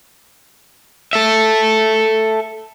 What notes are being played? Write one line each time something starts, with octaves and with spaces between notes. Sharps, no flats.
A4 E5